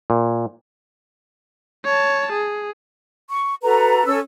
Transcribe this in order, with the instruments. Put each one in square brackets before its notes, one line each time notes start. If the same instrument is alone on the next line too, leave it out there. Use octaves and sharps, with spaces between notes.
[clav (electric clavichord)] A#2
[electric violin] C#5 A5
G#4
[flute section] C#6
F#4 A4 B4 A#5
C#4 A4 E6